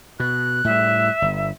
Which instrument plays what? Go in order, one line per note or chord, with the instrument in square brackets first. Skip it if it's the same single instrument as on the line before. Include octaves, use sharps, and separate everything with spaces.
[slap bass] B2 [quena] F#6
[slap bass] A2 G3 [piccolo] E5
[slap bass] G1